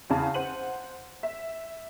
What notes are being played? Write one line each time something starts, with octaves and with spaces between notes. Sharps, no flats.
E2 C#3 A5
C5 F#5 D#7 F#7
E5